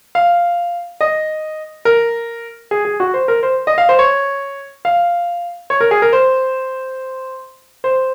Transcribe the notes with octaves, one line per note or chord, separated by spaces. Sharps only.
F5
D#5
A#4
G#4
G#4
F#4
C5
A#4
C5
D#5
F5
C5
C#5
F5
C#5
A#4
G#4
A#4
C5
C5